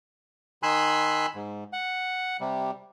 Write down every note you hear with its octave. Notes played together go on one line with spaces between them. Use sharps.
D#3 G#5 B5 C6 E6 F#6
G#2
F#5
C3 G3